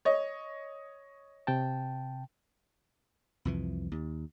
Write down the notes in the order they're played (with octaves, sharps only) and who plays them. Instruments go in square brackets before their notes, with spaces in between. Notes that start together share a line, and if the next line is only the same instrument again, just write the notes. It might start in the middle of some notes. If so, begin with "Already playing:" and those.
[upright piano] C#5 D#5
[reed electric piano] C3 G5 A5
[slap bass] C2 F2 E3
D#2